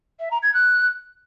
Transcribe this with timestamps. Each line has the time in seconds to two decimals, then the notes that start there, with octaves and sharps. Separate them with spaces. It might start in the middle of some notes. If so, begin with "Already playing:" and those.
0.20 E5
0.31 A#5
0.43 G#6
0.54 F#6